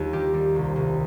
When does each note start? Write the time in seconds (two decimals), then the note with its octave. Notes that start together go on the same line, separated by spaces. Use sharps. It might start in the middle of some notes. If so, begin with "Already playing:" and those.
Already playing: D#2 G3 F4
0.13 D#3 G4
0.34 G3
0.55 C2
0.76 C2